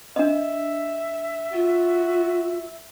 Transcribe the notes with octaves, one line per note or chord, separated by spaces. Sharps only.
D4 D#5 E5
F4 F#4